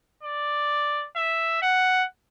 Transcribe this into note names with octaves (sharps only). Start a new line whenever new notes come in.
D5
E5
F#5